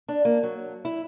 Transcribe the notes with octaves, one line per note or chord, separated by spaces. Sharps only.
D4
A#3
F#3
E4